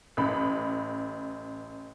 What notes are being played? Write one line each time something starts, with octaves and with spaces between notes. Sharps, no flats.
A1 B5